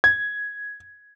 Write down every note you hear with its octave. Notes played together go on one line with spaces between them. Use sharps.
G#6